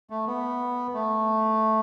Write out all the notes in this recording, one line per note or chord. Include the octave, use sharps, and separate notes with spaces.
A3
B3
A3